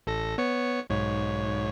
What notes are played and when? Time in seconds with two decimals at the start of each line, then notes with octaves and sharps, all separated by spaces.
0.07 A1 A4 A#6
0.38 B3 C#5 C#7
0.90 B1 G#2 C#5